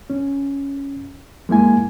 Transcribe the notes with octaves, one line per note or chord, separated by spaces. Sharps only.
C#4
G#3 A#3 E4 G#5